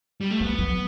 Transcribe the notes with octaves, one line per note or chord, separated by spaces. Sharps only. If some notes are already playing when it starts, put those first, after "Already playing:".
G3
A3
G3 B3
F#3